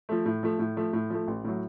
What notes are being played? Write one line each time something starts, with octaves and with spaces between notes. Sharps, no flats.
F3 A3
A2
F3 A3
A2
F3 A3
A2
F3 A3
A1
A2 F#3